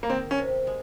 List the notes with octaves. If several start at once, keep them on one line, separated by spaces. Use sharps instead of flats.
A#3
D#3 C4
C#4
C3
G#3